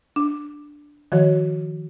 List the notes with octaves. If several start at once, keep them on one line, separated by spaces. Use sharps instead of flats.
D4
D#3 F3 F#4 C#5